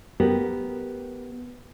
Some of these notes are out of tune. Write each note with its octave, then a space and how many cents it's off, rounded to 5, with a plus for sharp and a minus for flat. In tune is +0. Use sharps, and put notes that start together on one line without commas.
B3 +0 G4 +0 A#4 -5